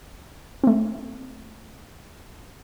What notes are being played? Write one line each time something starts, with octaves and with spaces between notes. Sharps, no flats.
A3 C4